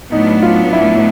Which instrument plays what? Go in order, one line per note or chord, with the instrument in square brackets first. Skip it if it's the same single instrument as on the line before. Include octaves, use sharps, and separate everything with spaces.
[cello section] A2 F#3 B3 D4 [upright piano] D#4
[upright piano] F4
E4